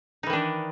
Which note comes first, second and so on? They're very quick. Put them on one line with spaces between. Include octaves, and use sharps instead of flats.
D#4 E3 D#3 D4